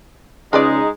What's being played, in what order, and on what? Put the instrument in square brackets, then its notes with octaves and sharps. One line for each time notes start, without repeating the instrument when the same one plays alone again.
[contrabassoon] C#3 [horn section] G#3 [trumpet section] D#4 [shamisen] F4 B4 D5